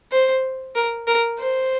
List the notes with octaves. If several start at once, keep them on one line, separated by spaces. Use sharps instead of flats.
C5
A#4
A#4
C5